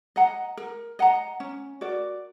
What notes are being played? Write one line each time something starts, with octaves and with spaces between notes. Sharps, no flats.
D#5 F#5 A#5
A#4
D#5 F#5 A#5
C#4
F#4 A#4 D5